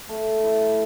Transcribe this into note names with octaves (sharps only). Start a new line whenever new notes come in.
A3
E4